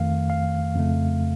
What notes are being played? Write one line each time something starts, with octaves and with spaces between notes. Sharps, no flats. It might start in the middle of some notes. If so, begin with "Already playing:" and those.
Already playing: F2 D#3 A3 F5
F5
F2 C#3 A3